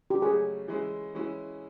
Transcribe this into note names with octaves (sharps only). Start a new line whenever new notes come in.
G4
C#3 F#3 A3 C#4 G#4
E3 G#3 C#4 E4
E3 G#3 C#4 E4